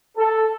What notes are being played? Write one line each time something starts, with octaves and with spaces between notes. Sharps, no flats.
A4